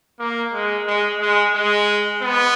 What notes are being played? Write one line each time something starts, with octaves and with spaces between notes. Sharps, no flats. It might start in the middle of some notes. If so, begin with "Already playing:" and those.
A#3
G#3
G#3
G#3
G#3
B3